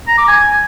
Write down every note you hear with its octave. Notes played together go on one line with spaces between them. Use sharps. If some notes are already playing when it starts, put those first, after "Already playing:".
A#5
D6
G#5